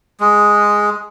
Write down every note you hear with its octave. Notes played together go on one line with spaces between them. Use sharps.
G#3